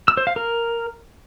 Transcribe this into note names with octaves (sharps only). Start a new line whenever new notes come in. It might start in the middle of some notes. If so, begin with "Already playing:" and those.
E6
C5
F5
A#4